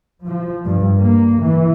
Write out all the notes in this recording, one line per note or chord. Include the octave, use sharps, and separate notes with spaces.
F3
G2
A#3
E3